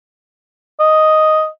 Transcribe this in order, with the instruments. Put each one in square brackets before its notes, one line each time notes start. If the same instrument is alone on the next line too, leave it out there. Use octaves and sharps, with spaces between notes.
[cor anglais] D#5